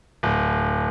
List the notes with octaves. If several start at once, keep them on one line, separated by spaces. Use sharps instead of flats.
D1